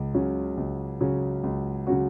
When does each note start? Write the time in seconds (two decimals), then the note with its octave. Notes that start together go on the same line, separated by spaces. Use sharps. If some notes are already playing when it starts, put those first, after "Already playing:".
Already playing: C#2
0.14 C#3 F#3 C#4 F#4
0.57 C#2
1.01 C#3 F#3 C#4 F#4
1.43 C#2
1.87 C#3 F#3 C#4 F#4